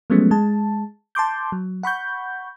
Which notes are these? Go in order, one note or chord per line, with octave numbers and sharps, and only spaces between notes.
F3 F#3 G#3 A3 B3 C#4
G#3 A5
A5 C6 D6 G6
F#3
F#5 B5 C#6 G6